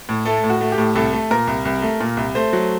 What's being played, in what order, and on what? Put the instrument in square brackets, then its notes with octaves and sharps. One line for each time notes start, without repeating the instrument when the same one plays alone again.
[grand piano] A2
A3 A4
A2
F#4
A3
G4
A2
C2 A4
A3
A#2 A#4
C2
C2
A3
A#2
C2
A3 C5
F#3